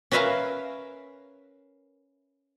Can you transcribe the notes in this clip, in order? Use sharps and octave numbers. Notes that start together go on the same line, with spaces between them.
C#4 A#4 B4 E5 F5 A#5